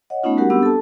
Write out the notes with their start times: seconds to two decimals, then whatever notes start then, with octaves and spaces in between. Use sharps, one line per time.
0.10 C#5 D#5 F#5
0.24 A3 B3 C#4 D#4 F4
0.37 G3 G#3 F#4 G4 A#4 F#5
0.50 B3 C4 D4 G4 E6
0.63 A4 A5